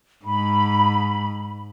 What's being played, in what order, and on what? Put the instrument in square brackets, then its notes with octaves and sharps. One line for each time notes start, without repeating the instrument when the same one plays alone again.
[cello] G#2 [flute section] B5